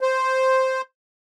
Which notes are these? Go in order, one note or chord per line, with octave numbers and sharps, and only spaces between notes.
C5